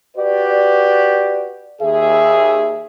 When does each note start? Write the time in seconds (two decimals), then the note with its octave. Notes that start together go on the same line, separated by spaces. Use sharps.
0.17 F#4 G4 B4 D5
1.81 D#2 G#4 E5